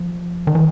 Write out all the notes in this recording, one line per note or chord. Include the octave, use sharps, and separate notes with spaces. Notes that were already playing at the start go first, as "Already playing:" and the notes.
Already playing: F3
D#3
E3